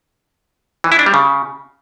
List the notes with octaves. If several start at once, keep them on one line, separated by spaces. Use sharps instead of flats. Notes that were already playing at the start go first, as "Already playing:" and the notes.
E3
E4
D4
G3
C#3